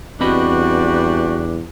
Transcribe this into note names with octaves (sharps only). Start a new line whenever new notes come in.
E2 G3 C4 D4 F#4 B4 D#5 B5